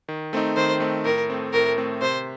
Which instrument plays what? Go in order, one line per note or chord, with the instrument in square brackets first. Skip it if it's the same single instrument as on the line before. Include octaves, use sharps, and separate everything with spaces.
[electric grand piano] D#3
A3 C4 D#4
[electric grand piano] D#3 [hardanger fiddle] C5
[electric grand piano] A3 C4 D#4
[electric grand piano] A2 [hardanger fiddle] A#4
[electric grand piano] A3 C4
[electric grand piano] A2 [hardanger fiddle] A#4
[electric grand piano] A3 C4
[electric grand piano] C3 [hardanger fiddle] C5